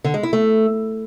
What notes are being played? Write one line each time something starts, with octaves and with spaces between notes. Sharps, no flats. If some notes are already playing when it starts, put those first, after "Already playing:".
D3
G#3
E4
A3